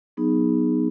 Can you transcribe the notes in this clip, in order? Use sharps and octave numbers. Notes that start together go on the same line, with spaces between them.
F#3 B3 D#4 G#4